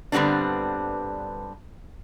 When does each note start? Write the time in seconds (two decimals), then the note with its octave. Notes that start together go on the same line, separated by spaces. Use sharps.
0.12 G2 D3 G3 B3 C4 D4